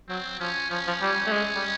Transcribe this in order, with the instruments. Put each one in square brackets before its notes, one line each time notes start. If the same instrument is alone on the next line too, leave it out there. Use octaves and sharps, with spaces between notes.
[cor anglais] F#3 [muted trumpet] C4
[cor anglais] F3 [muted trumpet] C#4
[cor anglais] F3 [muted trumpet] C#4
[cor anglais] F3
G3
A3
G#3
G3